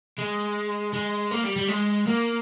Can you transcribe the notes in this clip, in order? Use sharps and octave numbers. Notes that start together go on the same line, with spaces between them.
G#3
G#3
A#3
G3
G3
G#3
A#3